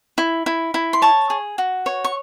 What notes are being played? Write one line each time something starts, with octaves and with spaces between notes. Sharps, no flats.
E4
E4
E4
C6
C#5 A5 C#6
G#4
F#4
C#5
C#6